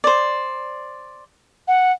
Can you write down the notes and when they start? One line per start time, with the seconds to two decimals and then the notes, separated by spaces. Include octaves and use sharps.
0.04 C5 D5
1.68 F#5